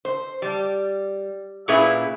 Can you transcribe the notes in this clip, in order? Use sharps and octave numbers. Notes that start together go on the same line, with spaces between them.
C5
G3
A#2 C#4 E4 G#4 B4 E5